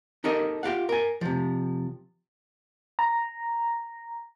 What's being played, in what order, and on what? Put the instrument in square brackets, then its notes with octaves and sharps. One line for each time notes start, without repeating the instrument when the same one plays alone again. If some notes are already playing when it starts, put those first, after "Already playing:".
[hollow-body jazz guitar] D#4 G4 A4 A#4 D#5
F4 G4 F5 F#5
A#4 G#5
C3 F3
[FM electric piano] A#5